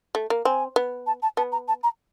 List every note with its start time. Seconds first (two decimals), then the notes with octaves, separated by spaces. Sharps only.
0.15 A3
0.30 A#3
0.45 C4 G#5
0.76 B3
1.07 A5
1.22 A5
1.37 B3 A5
1.52 A#5
1.68 A5
1.83 A#5